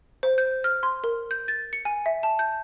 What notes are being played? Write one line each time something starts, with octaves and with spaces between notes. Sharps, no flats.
C5
G6
F6
C6
A#4
G6
A6
C#7
G#5
E5
A5
G6